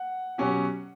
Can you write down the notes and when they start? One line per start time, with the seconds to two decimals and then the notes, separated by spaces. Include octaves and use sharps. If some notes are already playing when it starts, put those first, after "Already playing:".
Already playing: F#5
0.38 B2 F#3 C#4 G4